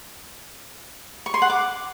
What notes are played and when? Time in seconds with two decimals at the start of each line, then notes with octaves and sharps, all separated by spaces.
1.26 C#6
1.34 C6
1.42 F#5
1.50 D6